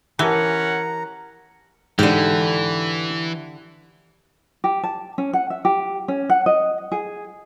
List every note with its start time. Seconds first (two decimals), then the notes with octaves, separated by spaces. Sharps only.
0.19 E3 C#4 G4 A#4 F#5 A5 A#5
1.99 G#2 D3 E3 G4
4.64 G4
4.83 A5
5.18 C#4
5.33 F#5
5.50 E5
5.65 G4
6.08 C#4
6.30 F#5
6.46 D#5
6.92 G#4